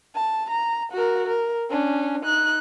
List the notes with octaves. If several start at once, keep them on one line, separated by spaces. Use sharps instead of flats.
A5
A#5
F#4 A#4
A#4
C#4 D4
D#4 F#6